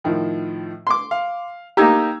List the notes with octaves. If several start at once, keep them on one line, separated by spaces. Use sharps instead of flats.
A2 D#3 F3
C6 D6
F5
A#3 D#4 G4 A#5 E6 G#6